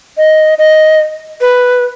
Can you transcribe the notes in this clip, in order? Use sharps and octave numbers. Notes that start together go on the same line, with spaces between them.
D#5
D#5
B4